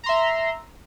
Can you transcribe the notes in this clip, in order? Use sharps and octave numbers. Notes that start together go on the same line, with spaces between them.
E5 A#5 C6